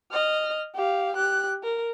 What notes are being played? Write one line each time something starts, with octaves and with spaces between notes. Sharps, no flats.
D#5 F6
G4 F5
G4 F#6
A#4